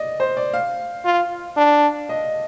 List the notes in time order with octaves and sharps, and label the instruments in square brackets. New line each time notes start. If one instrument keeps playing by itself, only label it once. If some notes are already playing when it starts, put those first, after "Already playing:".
Already playing: [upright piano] D5 D#5
C5
D5
F5
[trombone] F4
D4
[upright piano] D#5